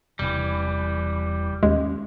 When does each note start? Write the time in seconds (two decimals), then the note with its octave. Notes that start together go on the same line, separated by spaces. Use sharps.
0.19 E1 C3 E3 G3
1.63 D#2 G#3 C#4